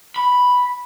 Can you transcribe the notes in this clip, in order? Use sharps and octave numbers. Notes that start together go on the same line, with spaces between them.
B5